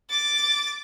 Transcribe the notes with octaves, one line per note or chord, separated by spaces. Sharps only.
D6 A6